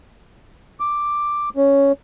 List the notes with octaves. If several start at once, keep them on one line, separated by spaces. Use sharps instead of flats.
D6
C#4